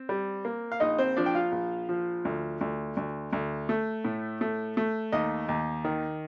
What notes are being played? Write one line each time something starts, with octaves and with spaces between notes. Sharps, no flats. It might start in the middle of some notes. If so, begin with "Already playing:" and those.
Already playing: C4
G3
A#3
F5
A#1 D#4 D#5
C4 C5
F3 D4 D5
G5
F4 F5
A#1
F3
D2
D2
D2
D2
A3
A2
A3
A3
D#2 D#4 D#5
D#2
D#3